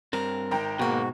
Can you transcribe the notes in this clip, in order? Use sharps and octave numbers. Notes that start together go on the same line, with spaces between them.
G2 C4 A#4
G#1 G5 A#5
G#2 B2 G#3 A#3 B3 F#4